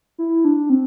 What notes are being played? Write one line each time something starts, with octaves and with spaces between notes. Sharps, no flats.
E4
D4
C4